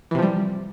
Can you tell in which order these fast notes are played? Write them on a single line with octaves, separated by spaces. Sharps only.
E3 C3 F3 G3